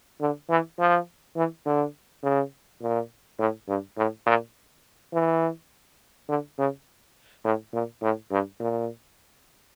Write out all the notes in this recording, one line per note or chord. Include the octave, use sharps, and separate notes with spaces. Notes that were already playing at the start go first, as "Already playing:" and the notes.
D3
E3
F3
E3
D3
C#3
A#2
A2
G2
A2
A#2
E3
D3
C#3
A2
A#2
A2
G2
A#2